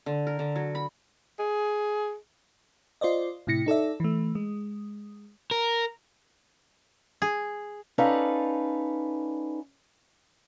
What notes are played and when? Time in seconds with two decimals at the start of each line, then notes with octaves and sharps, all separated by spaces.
0.06 D3
0.27 A#4
0.39 D3
0.56 F#3
0.75 B5
1.39 G#4
3.01 F4 C5 D5 D#5
3.47 A2 C3 E4 A#6 C#7
3.66 D#4 A4 D5 E5
4.00 E3 A3
4.35 G#3
5.51 A#4
7.22 G#4
7.98 C#4 D#4 A4 B4 D5 F5